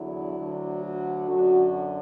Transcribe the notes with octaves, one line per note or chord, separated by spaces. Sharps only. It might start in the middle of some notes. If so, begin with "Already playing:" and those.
Already playing: E2 D3 F#3 E4
D2 D3 F#3
F#4
F#2 D3 F#3 F#4